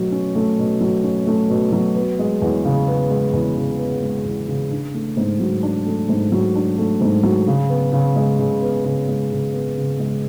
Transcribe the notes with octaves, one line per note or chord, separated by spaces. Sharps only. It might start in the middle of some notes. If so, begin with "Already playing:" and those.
Already playing: B2 F#3 A3 C#4
C#4
A3
B2
F#3
C#4
A3
B2
F#3
B3
G#3
E2
C#3
B3
G#3
E2
C#3
B3
G#3
E2
C#3
D4
A3
G#2
F#3
D4
A3
G#2
F#3
D4
A3
G#2
F#3
C#3
B3
C#3
G#3
C#3
B3
C#3
G#3
C#3
B3
C#3
G#3